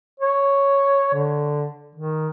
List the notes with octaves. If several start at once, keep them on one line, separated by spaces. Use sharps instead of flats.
C#5
D3
D#3